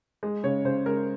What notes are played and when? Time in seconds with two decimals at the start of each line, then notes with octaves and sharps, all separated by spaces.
0.23 G#3
0.43 C#3 C#5
0.65 C#3 C5
0.86 G#3 A#4